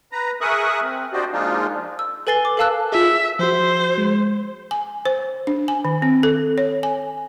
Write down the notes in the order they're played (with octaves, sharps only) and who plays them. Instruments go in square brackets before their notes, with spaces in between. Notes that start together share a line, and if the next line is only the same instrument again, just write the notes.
[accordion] B4 A#5
G#4 A#4 E5 C#6 D#6 F#6
C4
D4 F#4 G4 C5 D5 D#5
F3 G#3 A#3 D4 D#4 F4
[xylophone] E6
A4 B4 G#5 A6 C7 G7
D6
A4 A#4 F5 A5 E6 F#6
[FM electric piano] F4 G#4 [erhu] E5
[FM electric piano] F3 F#4 [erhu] C5
[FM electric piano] G#3
[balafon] G#5
C5
D4
G#5
D#3
C4
A4
C#5
G#5